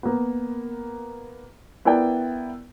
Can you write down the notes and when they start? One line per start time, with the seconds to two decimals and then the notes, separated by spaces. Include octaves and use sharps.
0.03 A#3 B3
1.85 B3 E4 A#4 D5 G5